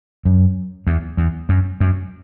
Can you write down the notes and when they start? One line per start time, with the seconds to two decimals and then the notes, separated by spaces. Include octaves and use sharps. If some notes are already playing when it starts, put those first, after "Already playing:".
0.25 F#2
0.87 E2
1.17 E2
1.49 F#2
1.80 F#2